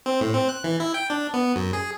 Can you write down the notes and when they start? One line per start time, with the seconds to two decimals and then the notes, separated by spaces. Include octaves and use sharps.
0.06 C4
0.21 A2
0.34 C4
0.49 F#6
0.64 E3
0.80 E4
0.94 G5
1.10 D4
1.34 B3
1.56 F#2
1.73 G#4